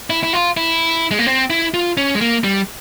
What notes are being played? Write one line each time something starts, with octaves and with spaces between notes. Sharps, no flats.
E4
E4
F4
E4
G#3
A#3
C4
E4
F4
C#4
G#3
A#3
G3